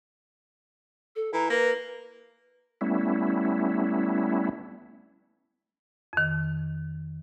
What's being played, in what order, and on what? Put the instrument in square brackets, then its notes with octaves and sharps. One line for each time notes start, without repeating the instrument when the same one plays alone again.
[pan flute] A4
[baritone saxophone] E3 [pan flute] A#5
[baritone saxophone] A#3 [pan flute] B4
[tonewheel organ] G3 A3 B3 C#4 E4
[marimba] F2 D#3